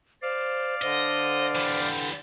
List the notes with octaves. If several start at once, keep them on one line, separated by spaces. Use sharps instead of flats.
C5 D5 F5
D3 C5 D#5
E3 G3